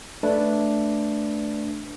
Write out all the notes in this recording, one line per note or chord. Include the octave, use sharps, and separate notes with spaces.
A3 D4 B4